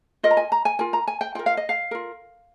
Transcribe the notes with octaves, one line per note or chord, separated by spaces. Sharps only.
F4 A#4 D#5
A#5
G#5
A#5
G#5
F4 A#4 G#5
A#5
G#5
G5
F4 A#4 G5
F5
D#5
F5
F4 A#4